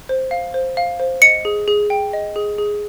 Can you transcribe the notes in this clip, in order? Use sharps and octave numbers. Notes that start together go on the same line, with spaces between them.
C5
F5
C5
F5
C5
D#5 C#7
G#4
G#4
G5
D#5
G#4
G#4